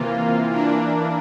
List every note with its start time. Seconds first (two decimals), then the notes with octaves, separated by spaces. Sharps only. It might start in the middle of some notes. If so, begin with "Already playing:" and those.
Already playing: C3 E3 A#3 F4
0.50 E3 A#3 D4